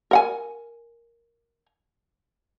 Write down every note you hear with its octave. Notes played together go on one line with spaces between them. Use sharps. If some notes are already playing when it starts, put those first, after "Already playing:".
A#4 F#5 G#5